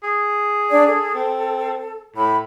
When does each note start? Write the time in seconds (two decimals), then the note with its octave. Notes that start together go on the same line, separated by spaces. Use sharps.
0.03 G#4
0.70 D4 D5
0.87 A4
1.14 C4
2.16 A2 B5